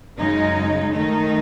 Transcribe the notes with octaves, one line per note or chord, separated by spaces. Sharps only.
F#2 C#3 G#3 D#4
D#3 A3 D#4